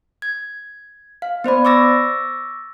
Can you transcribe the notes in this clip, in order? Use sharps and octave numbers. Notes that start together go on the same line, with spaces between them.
G#6
F5
B3 C5 D5 B5
C#6 D6 E6 A6 A#6